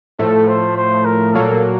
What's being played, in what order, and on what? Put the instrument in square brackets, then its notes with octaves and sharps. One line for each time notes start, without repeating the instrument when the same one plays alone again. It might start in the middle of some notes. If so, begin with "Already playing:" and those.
[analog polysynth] A2 F3 A3 [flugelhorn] A4
[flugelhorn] C5
C5
A#4
[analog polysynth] A#2 F#3 A#3 [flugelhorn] A4